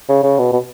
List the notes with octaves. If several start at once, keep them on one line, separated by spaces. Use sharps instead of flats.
C#3
C#3
B2
B2